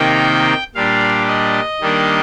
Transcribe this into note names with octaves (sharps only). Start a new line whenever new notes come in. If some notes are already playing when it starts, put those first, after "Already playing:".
Already playing: C3 D#3 A#3 D#4 G5
A#2 G3 D4 F5
D#5
D#3 G3 A#3 D4